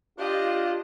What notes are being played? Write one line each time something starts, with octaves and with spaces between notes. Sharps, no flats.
D4 F4 G4 D#5